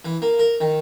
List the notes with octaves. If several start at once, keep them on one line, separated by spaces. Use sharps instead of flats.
E3
A#3
A#4
D#3